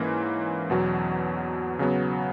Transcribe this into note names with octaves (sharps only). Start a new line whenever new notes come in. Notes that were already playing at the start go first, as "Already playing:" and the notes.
Already playing: G#2 E3 A#3 C#4
E2 B2 F#3
C#3 F#3 B3